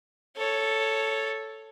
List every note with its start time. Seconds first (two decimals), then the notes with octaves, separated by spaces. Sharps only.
0.37 A4 C#5